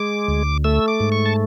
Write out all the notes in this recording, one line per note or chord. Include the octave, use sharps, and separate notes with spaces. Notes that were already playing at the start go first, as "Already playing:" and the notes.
Already playing: G#3 D6
D2
A3 E6
D6
G#2
C#6
A5